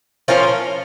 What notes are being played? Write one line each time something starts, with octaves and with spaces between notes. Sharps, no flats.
F3 A#3 C#4 F4